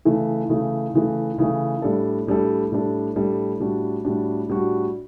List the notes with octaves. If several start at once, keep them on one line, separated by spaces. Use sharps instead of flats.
C#3 E3 A3
C#3 E3 A3
C#3 E3 A3
C#3 E3 A3
A2 G3 D4 A4
A2 G3 D4 A4
A2 G3 D4 A4
A2 G3 D4 A4
A2 G3 D4 F#4
A2 G3 D4 F#4
A2 G3 D4 F#4